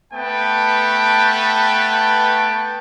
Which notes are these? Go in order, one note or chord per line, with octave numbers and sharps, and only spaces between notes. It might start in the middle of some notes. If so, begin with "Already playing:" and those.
A3 B3 B4 G5 A5